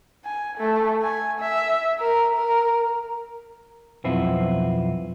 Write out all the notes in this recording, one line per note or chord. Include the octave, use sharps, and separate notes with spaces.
G#5
A3
G#5
E5
A#4
A#4
B1 F2 B3 C4 E4 F4